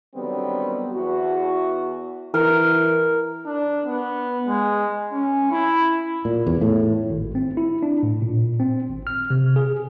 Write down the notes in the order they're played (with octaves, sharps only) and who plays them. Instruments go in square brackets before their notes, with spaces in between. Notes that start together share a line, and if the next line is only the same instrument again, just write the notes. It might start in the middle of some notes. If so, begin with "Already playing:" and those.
[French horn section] D3 D#3 F#3 G3 B3 C4
E2 F#4
[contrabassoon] E3 [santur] A#4
[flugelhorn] D4
B3
G#3
C#4
E4
[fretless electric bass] A#2
E2
A2
[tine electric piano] G#1
C4
E4
D4
A2
A#2
C4
G#1
F6
C3
G#4